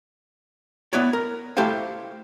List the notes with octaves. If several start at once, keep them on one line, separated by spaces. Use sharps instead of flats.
B3 E4 B4 C#5 D5
A#4
A3 E4 G4 A4 C5 F5